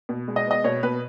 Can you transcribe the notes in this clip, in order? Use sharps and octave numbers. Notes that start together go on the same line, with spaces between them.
B2
G#3
D#5
B3 D#5
B2 C#5
B2 B4